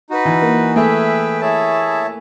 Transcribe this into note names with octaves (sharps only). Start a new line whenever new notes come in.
D#4 F#4 B4
E3
A#3
A3 G#4 B4 E5 G5
E4 G#4 C#5 E5 A5